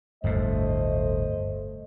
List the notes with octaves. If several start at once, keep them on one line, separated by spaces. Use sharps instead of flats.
G1 D2 A2 A3 C5 D#5